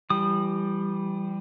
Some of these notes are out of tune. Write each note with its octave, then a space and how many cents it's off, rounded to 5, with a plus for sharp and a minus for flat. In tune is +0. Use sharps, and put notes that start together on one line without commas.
E3 +35 G3 +0 D#6 -30